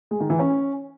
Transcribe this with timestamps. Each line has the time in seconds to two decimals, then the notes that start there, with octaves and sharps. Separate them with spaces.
0.11 G#3
0.20 D#3
0.30 E3
0.39 C#4